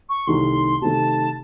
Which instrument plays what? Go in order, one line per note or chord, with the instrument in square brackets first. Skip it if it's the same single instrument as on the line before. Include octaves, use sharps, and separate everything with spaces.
[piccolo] C#6
[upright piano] C2 C3 D#3 A3 [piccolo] C6
[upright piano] C3 D#3 A3 [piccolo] A5